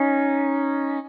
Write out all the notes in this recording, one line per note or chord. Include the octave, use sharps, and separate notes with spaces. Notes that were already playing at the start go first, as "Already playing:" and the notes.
Already playing: C#4 D#4